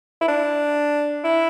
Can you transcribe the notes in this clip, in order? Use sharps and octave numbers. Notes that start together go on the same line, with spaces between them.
E4
D4
E4